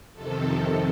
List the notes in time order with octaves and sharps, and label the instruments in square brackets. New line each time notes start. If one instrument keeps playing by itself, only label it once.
[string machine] F2 C3 D#3 A4